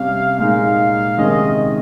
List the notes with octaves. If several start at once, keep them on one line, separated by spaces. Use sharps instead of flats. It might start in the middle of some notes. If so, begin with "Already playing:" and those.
Already playing: C3 G3 C#4 F5
A#2 G#3 D#4 F5
C3 D#3 G#3 C#4 D#5